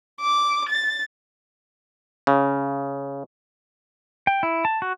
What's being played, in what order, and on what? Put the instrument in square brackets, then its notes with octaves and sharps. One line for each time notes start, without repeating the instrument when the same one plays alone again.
[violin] D6
A6
[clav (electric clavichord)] C#3
[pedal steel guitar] G5
E4
A5
F#4